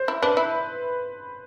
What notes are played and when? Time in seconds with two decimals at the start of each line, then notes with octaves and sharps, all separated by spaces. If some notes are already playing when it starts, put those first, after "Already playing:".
Already playing: C5
0.08 E4
0.22 D4 B4
0.37 E4